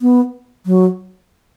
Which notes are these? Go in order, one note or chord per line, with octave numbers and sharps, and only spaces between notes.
B3
F#3